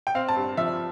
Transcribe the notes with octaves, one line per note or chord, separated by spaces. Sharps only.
G5
C4 F5
A5
G2
F3 E5